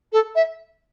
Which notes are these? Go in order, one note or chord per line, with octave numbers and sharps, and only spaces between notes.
A4
E5